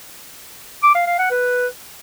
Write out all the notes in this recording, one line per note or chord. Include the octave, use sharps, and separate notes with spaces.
D6
F5
F5
F#5
B4